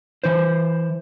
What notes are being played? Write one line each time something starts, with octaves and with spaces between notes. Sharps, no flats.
E3 E4 C5